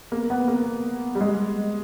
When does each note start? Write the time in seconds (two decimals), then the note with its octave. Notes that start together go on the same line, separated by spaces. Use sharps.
0.12 A#3
0.30 B3
0.48 A#3
1.15 G3
1.21 G#3